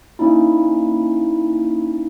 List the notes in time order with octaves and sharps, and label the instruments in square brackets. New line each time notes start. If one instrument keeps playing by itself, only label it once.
[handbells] A#3 C#4 D#4 E4